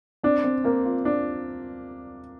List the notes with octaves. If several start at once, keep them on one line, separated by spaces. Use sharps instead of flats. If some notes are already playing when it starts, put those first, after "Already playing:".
C4 D4
C4
A#3 C4
F4
C4 D4